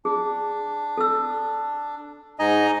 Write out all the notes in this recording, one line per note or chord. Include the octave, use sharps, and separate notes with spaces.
D4 G#4
A4 E6
G#2 D#4 D#5 G#5 A#5